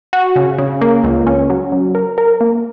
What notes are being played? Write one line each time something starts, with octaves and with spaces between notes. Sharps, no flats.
F#4
C#3
C#3
A#3
C#2
C#4
F#3
F#3
A#4
A#4
A#3